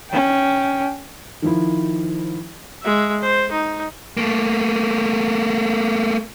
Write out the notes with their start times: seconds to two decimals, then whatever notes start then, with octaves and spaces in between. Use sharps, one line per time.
0.10 C#4 G5
1.42 D#3 F3 E4
2.82 G#3 E5
3.21 C5
3.52 D#4
4.17 A3 A#3